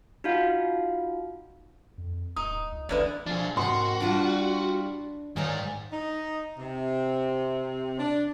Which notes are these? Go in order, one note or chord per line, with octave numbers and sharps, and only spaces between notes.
D#4 F4 F#4 F5
F2
D1 D#4 D#6
C#2
F1 E2 D3 E4 B4 D5 D#5
F3 D4 G#4
G#2 C3 F#4 A#4 C6
G3 D4 E4 F4
G#2 D#3 G#4 C#5 D5 F5
D#4
C3
D4